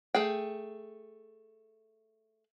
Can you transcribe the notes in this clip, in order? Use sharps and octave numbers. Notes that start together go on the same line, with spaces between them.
A3 G#4 G5